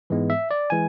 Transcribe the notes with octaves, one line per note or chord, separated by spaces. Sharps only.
G#2 E3 G#3 B3
E5
D5
E3 G#3 G#5